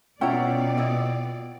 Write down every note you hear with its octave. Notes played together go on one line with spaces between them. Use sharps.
B2 C#4 E4 F4 D5 F#5 G5 A#5
E4 D#5